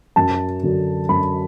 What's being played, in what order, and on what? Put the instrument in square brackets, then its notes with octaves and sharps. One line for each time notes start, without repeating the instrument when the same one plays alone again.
[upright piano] F#2 A5
D3 F#3
F#2 B5